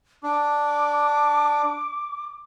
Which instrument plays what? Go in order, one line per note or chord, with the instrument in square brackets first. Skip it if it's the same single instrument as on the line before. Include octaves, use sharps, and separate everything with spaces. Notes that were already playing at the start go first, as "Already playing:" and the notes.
[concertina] D4 [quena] D6